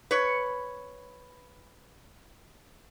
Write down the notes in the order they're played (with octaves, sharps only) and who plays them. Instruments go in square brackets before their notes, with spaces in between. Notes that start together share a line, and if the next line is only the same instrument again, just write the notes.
[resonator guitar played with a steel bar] B4 C#5